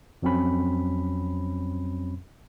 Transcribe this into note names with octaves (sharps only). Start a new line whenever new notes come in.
F2 F#3 C4 C#4 B5